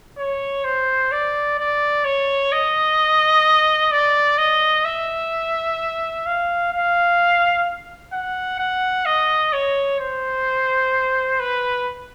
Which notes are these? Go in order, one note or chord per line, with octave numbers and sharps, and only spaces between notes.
C#5
C5
D5
D5
C#5
D#5
D5
D#5
E5
F5
F5
F#5
F#5
D#5
C#5
C5
B4